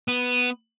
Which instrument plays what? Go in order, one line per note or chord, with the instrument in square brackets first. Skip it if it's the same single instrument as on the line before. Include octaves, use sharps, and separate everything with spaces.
[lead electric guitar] B3